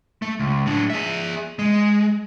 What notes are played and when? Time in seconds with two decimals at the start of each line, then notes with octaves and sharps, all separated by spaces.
0.22 A3
0.39 C#2
0.66 A2 D4
0.90 G#4 E5
1.59 G#3